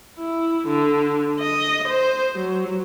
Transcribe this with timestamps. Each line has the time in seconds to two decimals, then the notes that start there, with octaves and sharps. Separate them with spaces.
0.19 E4
0.68 D3
1.40 D#5
1.88 C5
2.35 F#3